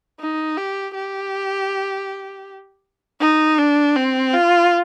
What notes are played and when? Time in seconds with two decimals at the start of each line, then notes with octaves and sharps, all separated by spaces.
0.20 D#4
0.57 G4
0.95 G4
3.21 D#4
3.58 D4
3.96 C4
4.34 F4